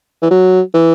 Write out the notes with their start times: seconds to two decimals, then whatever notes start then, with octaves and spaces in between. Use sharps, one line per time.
0.22 E3
0.31 F#3
0.74 E3